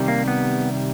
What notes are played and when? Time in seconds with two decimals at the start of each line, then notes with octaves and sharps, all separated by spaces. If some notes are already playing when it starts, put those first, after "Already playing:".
Already playing: C3 D#3 G3
0.08 A#3
0.28 B3